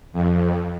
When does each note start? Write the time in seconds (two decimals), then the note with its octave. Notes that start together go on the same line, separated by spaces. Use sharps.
0.13 F2